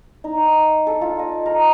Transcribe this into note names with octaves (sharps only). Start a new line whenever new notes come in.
D#4
A4
F4
D#5
A#4